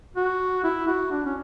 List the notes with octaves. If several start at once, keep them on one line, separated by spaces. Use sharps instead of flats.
F#4
E4
F#4
D4
C#4